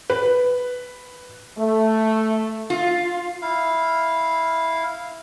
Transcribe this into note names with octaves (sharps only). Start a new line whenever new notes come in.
B4
A3
F4
E4 F5